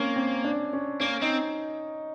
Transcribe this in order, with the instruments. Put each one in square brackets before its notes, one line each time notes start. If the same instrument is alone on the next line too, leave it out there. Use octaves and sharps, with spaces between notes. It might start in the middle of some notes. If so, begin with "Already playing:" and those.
Already playing: [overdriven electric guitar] A#3 [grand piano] C4 C#4
[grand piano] C4
D4
C#4
[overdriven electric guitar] A#3 [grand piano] C#4
[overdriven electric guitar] C4 [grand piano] D#4